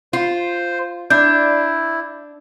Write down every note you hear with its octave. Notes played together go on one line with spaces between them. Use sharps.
F4 C5
D4 E4 G6